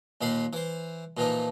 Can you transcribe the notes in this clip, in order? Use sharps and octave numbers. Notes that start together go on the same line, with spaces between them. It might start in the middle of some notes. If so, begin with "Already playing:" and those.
D#2 A#2 D#3 B5 C6
E3 C5
A#2 E3 F3 D#4